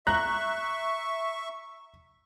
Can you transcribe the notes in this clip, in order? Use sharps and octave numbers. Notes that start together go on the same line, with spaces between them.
E5 A#5 C#6 F#6